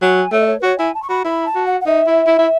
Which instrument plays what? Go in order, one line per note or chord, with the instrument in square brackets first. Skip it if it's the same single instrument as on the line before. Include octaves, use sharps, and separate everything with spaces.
[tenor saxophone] F#3 [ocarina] G#5
[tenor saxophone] A3 [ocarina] C#5
[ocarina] D#5
C#5
B4
[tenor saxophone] F#4 [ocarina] C#5
[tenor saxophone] E4 [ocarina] G#5
[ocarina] A5
C#6
[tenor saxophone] F#4 [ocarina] B5
[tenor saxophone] E4 [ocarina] B5
[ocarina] A5
[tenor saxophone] F#4
[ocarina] F#5
F#5
[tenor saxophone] D#4 [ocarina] E5
[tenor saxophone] E4
E4
E4